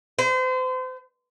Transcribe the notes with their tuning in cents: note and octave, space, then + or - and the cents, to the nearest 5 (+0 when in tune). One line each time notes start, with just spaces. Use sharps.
C5 -35